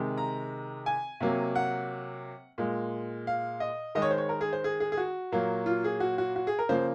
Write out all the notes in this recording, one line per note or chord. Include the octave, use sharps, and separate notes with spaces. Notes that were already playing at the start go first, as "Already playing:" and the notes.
Already playing: C3 D#3 G#3
A#5
G#5
C3 F#3 A#3
F#5
A#2 G#3
F5
D#5
D#3 G#3 D#5
C#5
C5
C#5
A#4
G#4
C5
G#4
G#4
G#4
F#4
A#2 F#3 A#3
F4
G#4
F#4
F#4
F#4
G#4
A#4
C#3 F3 A#3 C5